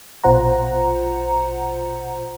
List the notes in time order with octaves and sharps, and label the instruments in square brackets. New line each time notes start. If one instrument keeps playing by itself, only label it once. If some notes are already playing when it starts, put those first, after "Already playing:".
[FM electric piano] A#1 B2 F4 C5 F#5 A#5